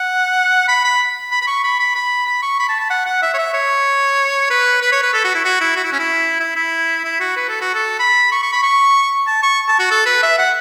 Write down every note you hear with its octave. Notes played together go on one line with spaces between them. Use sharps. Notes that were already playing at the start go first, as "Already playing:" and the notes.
Already playing: F#5
B5
B5
B5
B5
C#6
B5
B5
B5
B5
C#6
B5
A5
A5
F#5
F#5
E5
C#5
E5
C#5
B4
B4
C#5
B4
A4
F#4
E4
F#4
E4
F#4
E4
C#4
E4
E4
E4
E4
F#4
B4
A4
F#4
A4
B5
C#6
C#6
B5
C#6
A5
C#6
A5
F#4
A4
B4
E5
F#5